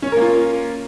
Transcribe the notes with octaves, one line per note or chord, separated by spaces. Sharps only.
A#3 C#4 F4 A#4 C#5